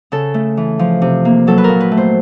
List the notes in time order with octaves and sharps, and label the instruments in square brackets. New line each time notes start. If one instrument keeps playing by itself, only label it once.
[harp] C#3 A4
A3
E3
F3
C3
A#3
F#3 A4
B4
A#2 A#4
B4
A3
C5